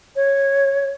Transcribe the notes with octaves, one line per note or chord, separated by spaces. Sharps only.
C#5